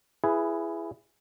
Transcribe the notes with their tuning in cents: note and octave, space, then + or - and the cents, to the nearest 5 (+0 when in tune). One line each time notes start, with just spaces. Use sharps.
E4 +20 G#4 +0 B4 +0